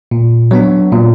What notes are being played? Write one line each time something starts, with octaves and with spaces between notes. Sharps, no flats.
A#2
F#3 B3 D4
A#2